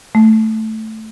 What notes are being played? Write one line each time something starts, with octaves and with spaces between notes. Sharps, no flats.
A3